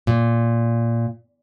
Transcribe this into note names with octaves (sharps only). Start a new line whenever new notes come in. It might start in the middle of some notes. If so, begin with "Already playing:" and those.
A#2